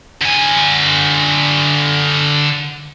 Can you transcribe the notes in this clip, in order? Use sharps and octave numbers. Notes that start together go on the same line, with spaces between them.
D3 G#5